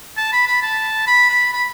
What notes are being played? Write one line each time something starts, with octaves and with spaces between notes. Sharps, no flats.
A5
B5
B5
A5
B5
B5
B5